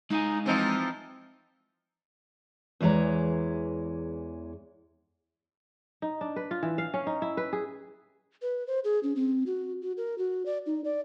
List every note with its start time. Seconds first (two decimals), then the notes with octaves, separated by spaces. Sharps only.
0.10 G#3 D#4 F5 G#5
0.46 E3 F3 C4 D#4
2.81 E2 E3 G#3 C#5 A#5
6.02 D#4
6.21 D4
6.36 B4
6.51 F4
6.63 E3
6.78 F5
6.94 C#4
7.07 D#4
7.22 E4
7.37 B4
7.53 G#4
8.42 B4
8.67 C5
8.84 G#4
9.03 C#4
9.16 C4
9.46 F#4
9.82 F#4
9.97 A#4
10.18 F#4
10.46 D5
10.66 D#4
10.84 D5